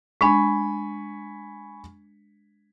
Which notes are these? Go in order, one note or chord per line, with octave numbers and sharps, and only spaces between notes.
G#3 D4 G#5 B5 C#6